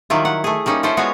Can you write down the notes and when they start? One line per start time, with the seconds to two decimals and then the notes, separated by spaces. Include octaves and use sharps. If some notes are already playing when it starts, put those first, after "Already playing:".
0.10 D#3 F#3 G3 E4 F4
0.25 F#5
0.44 A3 G#4
0.66 G3 A#3 C#4 D#4
0.83 C#4 E4 F4 A4 C5
0.97 G#3 B3 F#4 C#5 F5